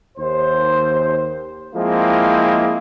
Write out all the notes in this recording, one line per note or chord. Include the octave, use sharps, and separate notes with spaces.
D#2 C5
F3 G#3 A#3 C4 E4